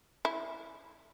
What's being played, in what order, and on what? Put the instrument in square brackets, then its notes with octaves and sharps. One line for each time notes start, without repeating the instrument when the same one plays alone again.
[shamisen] E4